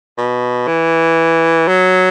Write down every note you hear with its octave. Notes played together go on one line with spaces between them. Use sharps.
B2
E3
F#3